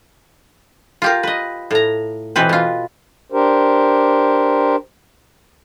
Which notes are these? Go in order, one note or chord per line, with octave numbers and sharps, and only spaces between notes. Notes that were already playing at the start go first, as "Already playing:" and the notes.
F4 G4 A#4
B4 D#5
A2 A#5
B2 E3 C4 B4
B2 F4
D4 G4 A#4 C5